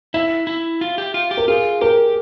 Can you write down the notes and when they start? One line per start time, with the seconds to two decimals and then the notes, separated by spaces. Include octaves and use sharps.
0.14 E4 E5
0.47 E4
0.81 F4
0.98 G4
1.14 F4
1.31 G4
1.37 A#4
1.48 F4 G#4
1.81 G4 A#4